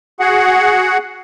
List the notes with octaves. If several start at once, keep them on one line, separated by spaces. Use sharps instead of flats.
F#4 G#4 F#5